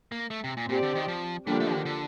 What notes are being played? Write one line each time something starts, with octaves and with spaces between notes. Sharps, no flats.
A#3
A3
C3
A#2
A#2 C4 G4 D5
D3
D#3
F3
D3 F3 G3 A#3 D4 G4
A3
D#3
D3